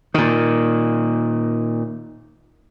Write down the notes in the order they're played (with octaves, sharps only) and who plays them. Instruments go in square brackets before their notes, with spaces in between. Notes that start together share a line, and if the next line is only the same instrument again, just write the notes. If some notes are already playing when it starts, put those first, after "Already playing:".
[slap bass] A#2 D#3